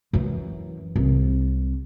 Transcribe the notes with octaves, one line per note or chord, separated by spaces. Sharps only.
F#2 E3
C2